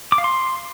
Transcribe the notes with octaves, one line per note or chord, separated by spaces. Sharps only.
D6
F5
C6